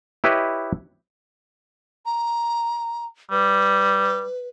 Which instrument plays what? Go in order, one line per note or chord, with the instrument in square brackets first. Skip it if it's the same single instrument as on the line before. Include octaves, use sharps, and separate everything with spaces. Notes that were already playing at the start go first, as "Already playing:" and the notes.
[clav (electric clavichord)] E4 G4 B4 C#5 D#5
[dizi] A#5
[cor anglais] G3 [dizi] B4